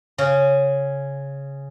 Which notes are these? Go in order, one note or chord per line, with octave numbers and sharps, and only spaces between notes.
C#3 C#4